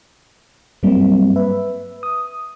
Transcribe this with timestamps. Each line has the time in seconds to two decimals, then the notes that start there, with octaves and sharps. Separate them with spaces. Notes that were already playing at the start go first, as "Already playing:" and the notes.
0.83 G2 F#3 G3 A#3 C4
1.36 B4 E5
2.03 D#6